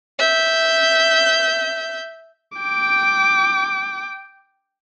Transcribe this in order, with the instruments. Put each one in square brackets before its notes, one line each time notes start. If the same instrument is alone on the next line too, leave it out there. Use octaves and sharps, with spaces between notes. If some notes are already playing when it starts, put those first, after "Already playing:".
[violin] E5 G6
[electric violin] G5 D6